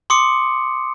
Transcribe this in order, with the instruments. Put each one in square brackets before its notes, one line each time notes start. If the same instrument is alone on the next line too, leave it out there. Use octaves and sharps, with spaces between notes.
[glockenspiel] C6 D6 D#6 C#7